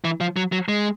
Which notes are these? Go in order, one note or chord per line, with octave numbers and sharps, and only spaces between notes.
E3
F3
F#3
F#3
G#3